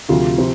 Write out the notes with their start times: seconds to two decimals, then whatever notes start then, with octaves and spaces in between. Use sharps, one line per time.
0.09 D2 C3 F3 F4
0.38 C3 F3 C4